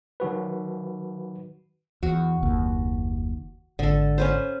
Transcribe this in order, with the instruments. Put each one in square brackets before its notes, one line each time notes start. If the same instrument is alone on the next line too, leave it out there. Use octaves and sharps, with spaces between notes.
[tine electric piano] D#3 F#3 F#4 B4
[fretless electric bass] E2 [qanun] F#4
[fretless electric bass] F#1 D#2
[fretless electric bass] G#1 [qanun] D3 A4
[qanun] C#4 B4 C5